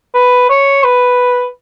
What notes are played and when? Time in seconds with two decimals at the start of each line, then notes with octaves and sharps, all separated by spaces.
0.14 B4
0.50 C#5
0.84 B4